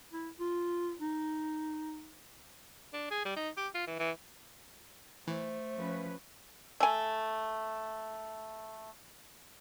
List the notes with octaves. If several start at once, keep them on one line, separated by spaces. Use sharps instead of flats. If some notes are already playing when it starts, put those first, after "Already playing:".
E4
F4
D#4
D4
G#4
G3
D#4
G4
F4
E3
E3
E3 A3 C5
F3 C#4 B4
A3 G#5